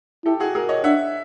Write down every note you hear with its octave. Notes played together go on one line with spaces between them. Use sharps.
E4 G4 A4
F#4 G#4
G#4 A#4
C#5 D#5
D4 E5 F#5